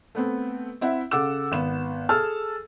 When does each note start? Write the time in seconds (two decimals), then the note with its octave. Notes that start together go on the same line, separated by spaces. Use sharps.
0.15 A3 B3 C4
0.81 C4 E4 E5 F#5
1.11 C#3 A4 F#5 D6 E6 E7
1.52 G#1 B3 E7
2.09 G#4 A4 A5 E6 F6